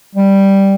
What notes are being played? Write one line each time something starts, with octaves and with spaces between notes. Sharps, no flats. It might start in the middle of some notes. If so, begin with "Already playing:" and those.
G3